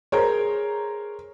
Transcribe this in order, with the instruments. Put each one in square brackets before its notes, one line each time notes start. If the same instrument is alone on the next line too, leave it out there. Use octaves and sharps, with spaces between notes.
[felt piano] G#4 [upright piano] A#4 C5 C#5